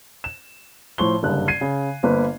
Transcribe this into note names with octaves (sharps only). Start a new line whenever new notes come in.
E7
A2 F3 C6 C#6 G7
F#1 G2 D3 F#6
G#6 C7 D#7
C#3
G1 A#3 B4 C5